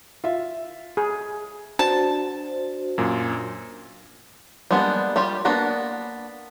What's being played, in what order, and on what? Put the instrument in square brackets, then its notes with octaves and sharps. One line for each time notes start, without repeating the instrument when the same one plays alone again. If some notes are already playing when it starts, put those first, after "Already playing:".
[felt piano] F4 E5
[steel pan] G#4
[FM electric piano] D4 F#4 C5 [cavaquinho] A5
[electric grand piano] F#2 A#2
[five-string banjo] G3 G#3 A#3 B3 D4
G3 F4 G4
A#3 B3 D4 B4 A#5